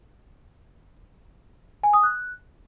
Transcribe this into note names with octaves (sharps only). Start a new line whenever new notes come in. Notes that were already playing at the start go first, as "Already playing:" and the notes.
G#5
D#6
F#6